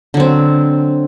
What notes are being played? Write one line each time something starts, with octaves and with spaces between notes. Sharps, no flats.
D3 F#3 C4